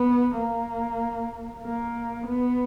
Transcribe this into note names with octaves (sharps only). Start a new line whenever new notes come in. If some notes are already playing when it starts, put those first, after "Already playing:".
Already playing: B3
A#3
A#3
B3